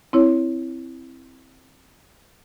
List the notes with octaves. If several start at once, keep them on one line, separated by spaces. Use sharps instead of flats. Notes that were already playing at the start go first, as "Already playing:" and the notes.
C4 E4 C#5